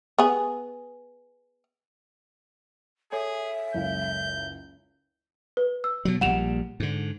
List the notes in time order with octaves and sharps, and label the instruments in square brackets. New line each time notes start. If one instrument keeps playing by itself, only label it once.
[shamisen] B3 G#4
[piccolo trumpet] G#4 [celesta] A4 C#5 G#5 [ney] E5
[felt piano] F#1 C#2 F5 [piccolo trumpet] G6
[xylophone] B4
E6
[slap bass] B2 F#3
[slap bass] A#1 A#2 G3 [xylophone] F#5 E7 F7
[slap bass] G#2 D3